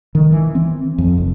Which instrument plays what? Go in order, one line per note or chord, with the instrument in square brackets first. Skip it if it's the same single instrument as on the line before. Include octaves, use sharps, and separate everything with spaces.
[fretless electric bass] D#3
E3
C4
F2
F1